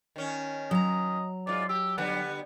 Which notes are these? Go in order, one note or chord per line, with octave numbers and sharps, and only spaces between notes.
D#3 C#4
F#3 D#5 A#5
G#2 F4 D5
G4 E6
D3 G3 B3 F#5